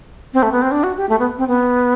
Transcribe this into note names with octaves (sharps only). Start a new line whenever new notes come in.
C4
A3
B3
C4
D4
F#4
G4
A3
B3
C4
B3